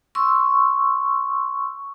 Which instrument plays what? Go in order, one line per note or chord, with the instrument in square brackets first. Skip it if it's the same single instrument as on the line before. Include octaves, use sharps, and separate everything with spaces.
[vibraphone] C6 C#6 E6